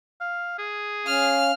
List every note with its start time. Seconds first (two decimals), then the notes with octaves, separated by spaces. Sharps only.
0.21 F5
0.58 G#4
1.06 C#4 F5 F6